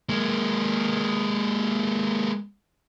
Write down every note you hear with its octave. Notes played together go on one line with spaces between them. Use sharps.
G#3 A#3